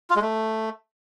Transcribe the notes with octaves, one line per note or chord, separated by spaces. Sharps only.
F4
G#3
A3